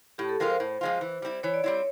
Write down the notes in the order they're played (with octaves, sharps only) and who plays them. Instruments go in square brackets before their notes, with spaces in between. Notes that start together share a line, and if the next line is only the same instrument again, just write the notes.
[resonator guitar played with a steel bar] A2 [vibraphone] G4
[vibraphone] A4
[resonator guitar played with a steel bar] F3 G#3 C4 F4 [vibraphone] A#4
[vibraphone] C5
[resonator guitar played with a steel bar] A2
F3 G#3 C4 F4
E3
G3 C4 E4
[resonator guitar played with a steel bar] E3 [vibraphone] C#5
[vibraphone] D5
[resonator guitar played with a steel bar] G3 C4 E4 [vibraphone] C#5
[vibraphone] C#5